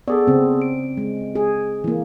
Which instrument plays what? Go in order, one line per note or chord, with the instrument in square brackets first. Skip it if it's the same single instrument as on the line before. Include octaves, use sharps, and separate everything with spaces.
[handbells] B3 G#4 A4 [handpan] D5
[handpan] C#3 C4
[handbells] D7
[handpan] G#3
G#4
E3 A#3